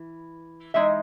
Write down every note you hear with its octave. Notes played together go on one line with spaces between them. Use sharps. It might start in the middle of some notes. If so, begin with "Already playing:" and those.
Already playing: E3
E3 G#3 D#4 E5